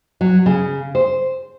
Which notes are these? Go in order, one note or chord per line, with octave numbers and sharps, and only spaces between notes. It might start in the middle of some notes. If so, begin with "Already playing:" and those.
F#3
C#3
C5